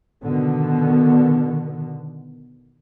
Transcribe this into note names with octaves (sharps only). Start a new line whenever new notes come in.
B2 D3 D#3 B3